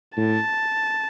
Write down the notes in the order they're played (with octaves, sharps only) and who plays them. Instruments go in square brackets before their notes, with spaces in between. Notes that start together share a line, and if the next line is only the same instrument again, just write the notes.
[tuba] A2 [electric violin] A5